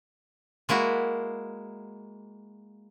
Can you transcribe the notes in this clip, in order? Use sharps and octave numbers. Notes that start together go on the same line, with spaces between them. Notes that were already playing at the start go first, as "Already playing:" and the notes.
G#3 A#3 E4 F#4